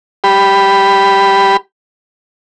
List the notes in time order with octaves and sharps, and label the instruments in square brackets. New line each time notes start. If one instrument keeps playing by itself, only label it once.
[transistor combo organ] G4 B5